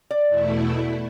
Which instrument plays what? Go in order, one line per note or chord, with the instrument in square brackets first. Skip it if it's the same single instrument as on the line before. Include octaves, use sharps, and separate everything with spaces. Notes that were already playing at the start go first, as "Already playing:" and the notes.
[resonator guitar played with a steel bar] D5
[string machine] E2 B2 A3 E4